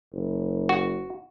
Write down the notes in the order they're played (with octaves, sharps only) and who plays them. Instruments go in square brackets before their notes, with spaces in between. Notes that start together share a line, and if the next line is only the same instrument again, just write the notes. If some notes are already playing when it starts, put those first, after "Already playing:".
[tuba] F#1
[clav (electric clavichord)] F#4